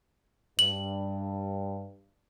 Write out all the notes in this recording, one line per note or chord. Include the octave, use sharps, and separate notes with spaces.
G2 F#7